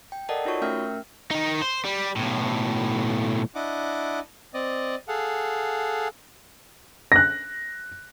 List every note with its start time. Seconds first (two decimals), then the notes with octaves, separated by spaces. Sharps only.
0.12 G5
0.29 A4 A#4 D5 D#5 F#5 A5
0.45 D#4 F4 F#4 C#5 C#6
0.62 A3 C#4 A#4 E5 G5 F6
1.31 D#3 D#4
1.62 C5
1.85 G3
2.17 B1 A2
3.55 D4 E4 D#5 F#5 D6
4.54 C4 D5 D#5
5.08 G#4 A4 F5 F#5
7.12 F#6 A#6